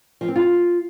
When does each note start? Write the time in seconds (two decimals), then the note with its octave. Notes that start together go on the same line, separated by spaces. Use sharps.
0.21 F3
0.28 C4
0.36 F4